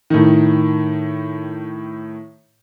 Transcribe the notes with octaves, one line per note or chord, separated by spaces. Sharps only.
A2 D#3